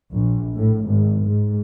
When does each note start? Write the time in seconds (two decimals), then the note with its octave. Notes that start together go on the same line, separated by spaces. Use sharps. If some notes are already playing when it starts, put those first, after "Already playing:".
0.12 A#1
0.55 A2
0.87 G#1
1.21 G#2